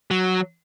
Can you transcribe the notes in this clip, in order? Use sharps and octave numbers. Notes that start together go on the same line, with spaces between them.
F#3